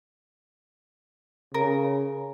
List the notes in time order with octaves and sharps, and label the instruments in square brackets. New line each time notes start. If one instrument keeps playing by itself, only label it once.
[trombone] C#3 [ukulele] A#4